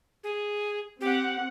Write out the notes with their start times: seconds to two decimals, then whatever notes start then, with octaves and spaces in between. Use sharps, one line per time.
0.24 G#4
1.01 C4 G4 F#5